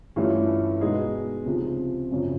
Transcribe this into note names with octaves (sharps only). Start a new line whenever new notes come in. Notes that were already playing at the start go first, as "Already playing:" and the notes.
G2 E3 A3 C#4 F4
B2 G#3 B3 D#4 G#4
C#2 C3 F3
G#1 F#2 C#3 F3